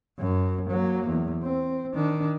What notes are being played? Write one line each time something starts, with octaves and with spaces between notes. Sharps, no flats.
F#2
F#3 A#3
E2
C4
D#3 D4